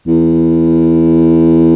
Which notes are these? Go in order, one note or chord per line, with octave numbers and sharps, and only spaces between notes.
E2